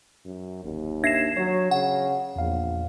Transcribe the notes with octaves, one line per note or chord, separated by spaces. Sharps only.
F#2
G1 D#2
D4 E5 G#6 A#6 C7 E7
F#3 C#5
C#3 F#5
A#1 E2 F5